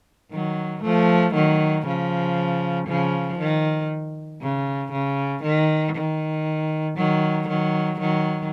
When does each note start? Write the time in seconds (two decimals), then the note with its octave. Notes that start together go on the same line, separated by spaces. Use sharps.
0.32 D#3 F#3
0.83 F3 A3
1.34 D#3 F#3
1.86 C#3 F3
2.88 C#3 F3
3.39 D#3
4.41 C#3
4.92 C#3
5.43 D#3
5.95 D#3
6.97 D#3 F#3
7.48 D#3 F#3
8.00 D#3 F#3